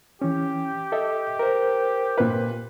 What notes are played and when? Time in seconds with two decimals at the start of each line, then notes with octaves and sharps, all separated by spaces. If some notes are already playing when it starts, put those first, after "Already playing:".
0.22 E3 C#4 G4
0.92 A4 D#5 E5
1.39 A#4 C5
2.18 A#2 B4